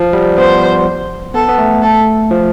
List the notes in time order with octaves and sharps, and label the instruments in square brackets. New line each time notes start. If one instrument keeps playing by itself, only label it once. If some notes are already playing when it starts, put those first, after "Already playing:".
Already playing: [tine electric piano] F3
G3
[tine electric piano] B3 [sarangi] C5
[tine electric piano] B3 [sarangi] A4
[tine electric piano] B3
A3
[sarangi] A4
[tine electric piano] F3